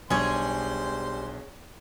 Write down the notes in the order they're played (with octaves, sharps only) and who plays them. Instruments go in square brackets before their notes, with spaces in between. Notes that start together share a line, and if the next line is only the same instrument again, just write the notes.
[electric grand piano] B1 D4 G#5 [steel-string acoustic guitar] G3 [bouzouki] G#4 C#5 [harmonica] C5 C6